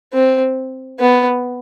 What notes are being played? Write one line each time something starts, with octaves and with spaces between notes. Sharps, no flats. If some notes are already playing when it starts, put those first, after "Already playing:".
C4
B3